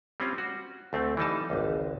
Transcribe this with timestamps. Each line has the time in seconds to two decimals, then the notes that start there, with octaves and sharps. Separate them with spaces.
0.20 G3 C4 C#4 F4
0.38 F#4
0.93 D2 A3 C4
1.17 E3 G3 D#4 A5
1.50 G#1 C#2